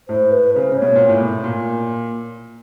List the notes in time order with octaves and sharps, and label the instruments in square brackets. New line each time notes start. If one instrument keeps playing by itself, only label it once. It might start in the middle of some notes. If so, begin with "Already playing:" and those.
[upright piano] A2 [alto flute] C5
[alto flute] B4
[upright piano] C#3 [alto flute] C5
[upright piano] C3
[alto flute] C#5
[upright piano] B2
A#2
A2
A#2